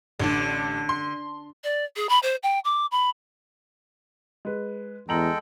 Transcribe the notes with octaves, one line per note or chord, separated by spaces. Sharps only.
A1 D3 D4
C6
D5
G#4
B5
C5
G5
D6
B5
G#3 B4
E2 G#3 A4 G5 A#5 F#7